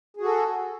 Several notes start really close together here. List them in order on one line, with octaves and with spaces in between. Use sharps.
G#4 F#4 A4